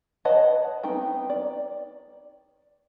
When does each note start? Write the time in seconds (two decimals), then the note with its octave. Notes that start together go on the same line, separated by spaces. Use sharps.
0.25 B4 C#5 D#5 F#5 A5
0.83 B3 C4 D#4 G5
1.30 D5